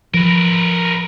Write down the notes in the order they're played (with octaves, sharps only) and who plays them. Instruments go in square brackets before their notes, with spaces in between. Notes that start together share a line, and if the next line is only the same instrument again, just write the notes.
[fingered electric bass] F3 [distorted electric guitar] A#4 B4